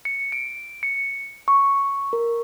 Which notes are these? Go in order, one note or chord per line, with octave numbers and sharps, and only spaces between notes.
C#7
D7
C#7
C#6
A#4